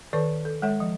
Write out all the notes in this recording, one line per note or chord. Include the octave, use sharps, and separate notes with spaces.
D#3 A4 B4 D5 A5
A4
G#3 A4 C#5 E5 F#5
F3